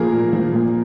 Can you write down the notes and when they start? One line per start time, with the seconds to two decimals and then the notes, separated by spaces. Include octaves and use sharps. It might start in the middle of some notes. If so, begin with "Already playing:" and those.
Already playing: F3 A#3 G#4 A#4
0.13 A#2
0.33 F3 A#3
0.53 A#2